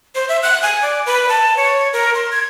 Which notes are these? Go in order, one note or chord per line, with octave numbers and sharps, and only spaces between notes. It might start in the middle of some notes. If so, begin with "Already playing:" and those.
C5
E5
F#6
G#5
D5
B4
A5
C#5
A#4
C6
G#6